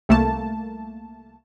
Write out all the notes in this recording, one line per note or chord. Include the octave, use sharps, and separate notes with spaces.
C2 A3 A#3 A5